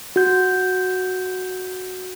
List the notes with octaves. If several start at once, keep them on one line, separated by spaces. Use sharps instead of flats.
F#4 G6